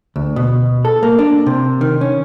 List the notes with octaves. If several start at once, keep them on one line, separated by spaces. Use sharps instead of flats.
D2
B2
A4
A#3
D4
C3
D#3
C#4